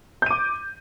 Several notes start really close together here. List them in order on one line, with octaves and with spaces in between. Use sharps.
G6 D#7 D6